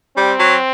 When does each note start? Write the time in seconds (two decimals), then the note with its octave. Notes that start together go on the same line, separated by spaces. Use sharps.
0.17 G3 C4
0.39 F#3